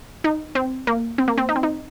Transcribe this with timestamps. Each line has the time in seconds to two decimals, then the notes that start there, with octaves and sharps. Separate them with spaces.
0.24 D#4
0.55 C4
0.87 A#3
1.18 C4
1.28 A#3
1.38 C4
1.49 D#4
1.56 C4
1.63 D#4